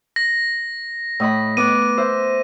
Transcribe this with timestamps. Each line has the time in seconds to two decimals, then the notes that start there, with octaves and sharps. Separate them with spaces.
0.16 A#6
1.20 A2 D#5 B5
1.57 B3 D6 F#6 D#7
1.97 C5 E5